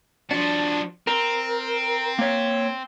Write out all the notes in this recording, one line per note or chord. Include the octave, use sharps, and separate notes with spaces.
F3 D4 F#4
C4 A#4
A#3 C#5